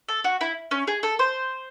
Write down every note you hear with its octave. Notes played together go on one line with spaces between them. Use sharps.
A4
F#4
E4
C#4
G#4
A4
C5